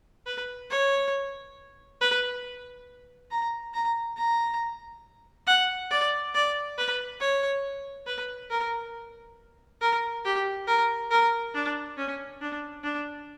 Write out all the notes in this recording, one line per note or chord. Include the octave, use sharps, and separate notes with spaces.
B4
C#5
B4
A#5
A#5
A#5
F#5
D5
D5
B4
C#5
B4
A#4
A#4
G4
A#4
A#4
D4
C#4
D4
D4